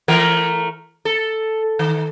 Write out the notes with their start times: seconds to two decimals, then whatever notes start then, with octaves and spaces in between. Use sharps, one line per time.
0.08 E3 A3 A#4
1.05 A4
1.79 D#3